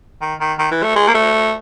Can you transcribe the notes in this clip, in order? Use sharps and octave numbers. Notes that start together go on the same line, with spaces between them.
D#3
D#3
D#3
E3
A3
G#3
A#3
A3